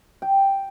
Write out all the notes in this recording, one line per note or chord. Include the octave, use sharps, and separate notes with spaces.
G5